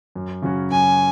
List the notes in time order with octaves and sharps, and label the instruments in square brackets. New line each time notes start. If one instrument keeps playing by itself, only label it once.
[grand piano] F#2
C#3 F#3 C#4 F#4
[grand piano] F#2 [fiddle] G#5